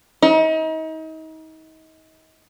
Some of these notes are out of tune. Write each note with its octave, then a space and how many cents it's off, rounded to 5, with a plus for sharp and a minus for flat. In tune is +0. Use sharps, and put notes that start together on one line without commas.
D#4 +35